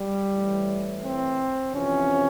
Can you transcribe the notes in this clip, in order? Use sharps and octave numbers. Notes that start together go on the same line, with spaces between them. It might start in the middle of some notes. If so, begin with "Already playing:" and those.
Already playing: G3
A2 E3
C4
F2 C3 E3 C#4